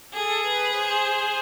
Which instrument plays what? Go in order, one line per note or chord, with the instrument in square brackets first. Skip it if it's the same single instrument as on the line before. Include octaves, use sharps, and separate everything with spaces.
[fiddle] G#4 [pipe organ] A4
[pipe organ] B4
C5